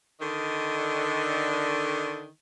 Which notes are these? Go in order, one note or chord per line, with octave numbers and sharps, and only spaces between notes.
D3 D#3